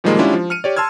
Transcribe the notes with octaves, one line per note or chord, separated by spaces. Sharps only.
A#2 D#3 F3 G3 G#3 A#3
G#3 C#4 D4 E4 F4 G4
F3
F6 C#7 D#7
G4 C#5 D5
A5 C6 E6 F6 G#6